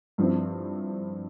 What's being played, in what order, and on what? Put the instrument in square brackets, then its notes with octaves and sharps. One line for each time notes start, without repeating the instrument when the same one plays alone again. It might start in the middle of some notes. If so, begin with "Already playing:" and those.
[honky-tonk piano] G2 F3 C4 E4